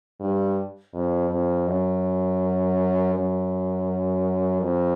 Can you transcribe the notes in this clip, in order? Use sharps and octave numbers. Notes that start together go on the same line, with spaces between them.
G2
F2
F2
F#2
F#2
F2